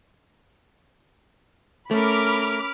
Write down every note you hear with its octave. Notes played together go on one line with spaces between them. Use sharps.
A3 C#4 A#4 B5 D6 F6